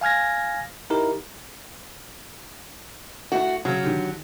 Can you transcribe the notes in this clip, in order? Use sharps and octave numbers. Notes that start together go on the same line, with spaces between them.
F5 G#5 F6 G#6 A#6
D#4 E4 G4 A#4
A3 E4 F#4 F#5
C#3 F#3
D3 D#3 G4